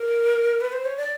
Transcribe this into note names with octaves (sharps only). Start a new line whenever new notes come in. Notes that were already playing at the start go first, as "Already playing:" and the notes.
Already playing: A#4
B4
C5
C#5
D5